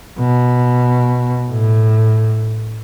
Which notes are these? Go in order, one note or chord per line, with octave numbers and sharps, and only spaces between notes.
B2
A2